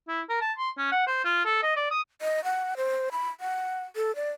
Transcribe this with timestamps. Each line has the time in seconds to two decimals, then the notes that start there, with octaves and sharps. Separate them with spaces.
0.08 E4
0.29 A#4
0.41 A5
0.58 C6
0.77 C#4
0.91 F#5
1.07 C5
1.25 F4
1.45 A4
1.63 D#5
1.76 D5
1.91 D#6
2.22 D#5
2.44 F#5
2.77 C5
3.12 B5
3.40 F#5
3.96 A4
4.16 D5